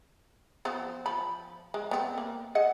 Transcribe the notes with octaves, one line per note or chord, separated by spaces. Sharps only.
F3 B3 C5
F3 B5
G#3
B3 C4
A#3
G#4 D#5 F#5